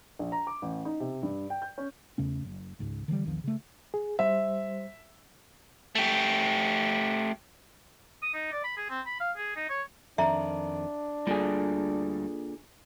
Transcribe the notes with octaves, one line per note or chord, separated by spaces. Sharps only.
A#1
A#5
D6
A1
D#4
C3
G2
G5
G6
C#4
E2 C#3 A3 C#4
F#1
G#1 C#2 G#2
D3 E3 F3 G3
A#1 E2 D#3 F3
C#3 A3
G#4
G3 C5 E5
A3 G4
D#6
D#4
D5
B5
G#4
C4
B5
F5
G#4
D#4
C#5
F2 D#3 D4 E5 A#5
D2 A#2 D3 G3 G#4